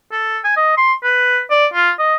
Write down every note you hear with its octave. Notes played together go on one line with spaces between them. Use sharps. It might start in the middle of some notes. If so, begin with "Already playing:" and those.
A4
G#5
D#5
C6
B4
D5
F4
D#5